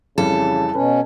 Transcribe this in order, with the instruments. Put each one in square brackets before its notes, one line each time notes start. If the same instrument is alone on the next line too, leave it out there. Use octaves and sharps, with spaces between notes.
[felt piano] F2 E3 G3 [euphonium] C#3 [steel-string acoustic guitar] A4
[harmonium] B2 C#4 [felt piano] B4